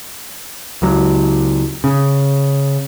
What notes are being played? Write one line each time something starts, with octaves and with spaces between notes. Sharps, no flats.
C#2 F#3
C#3